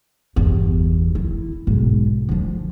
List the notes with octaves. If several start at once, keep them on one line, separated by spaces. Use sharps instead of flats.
G1 E2
E4
B1 G#2
F3 D4